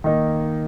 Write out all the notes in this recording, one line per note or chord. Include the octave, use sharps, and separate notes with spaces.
D#3 A#3 D#4